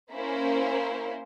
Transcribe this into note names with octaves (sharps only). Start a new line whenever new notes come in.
A#3 C#4 E4 C5